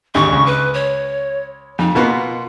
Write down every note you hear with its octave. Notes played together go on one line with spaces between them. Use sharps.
G#1 D2 G4 C#6
C#2
B4
C#5
F2 D#4
B2 A#3 B3 F4